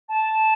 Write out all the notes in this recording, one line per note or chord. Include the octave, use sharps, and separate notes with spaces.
A5